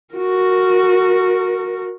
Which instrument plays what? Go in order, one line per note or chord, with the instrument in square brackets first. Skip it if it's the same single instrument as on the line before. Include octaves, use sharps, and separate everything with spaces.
[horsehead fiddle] F#4 A#4